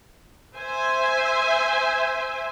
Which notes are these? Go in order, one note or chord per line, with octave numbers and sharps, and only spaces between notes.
C5 E5 G#5